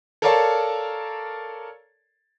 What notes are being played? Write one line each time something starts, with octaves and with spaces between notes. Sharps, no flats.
A4 A#4 C#5 D5 F5 A5